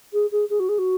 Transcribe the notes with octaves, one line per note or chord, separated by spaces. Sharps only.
G#4
G#4
G#4
F#4
G#4
F#4